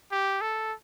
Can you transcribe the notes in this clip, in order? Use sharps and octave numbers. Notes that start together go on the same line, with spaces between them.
G4
A4